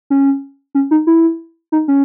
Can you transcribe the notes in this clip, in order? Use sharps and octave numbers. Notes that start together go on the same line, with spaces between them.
C#4
C#4
D#4
E4
D#4
C#4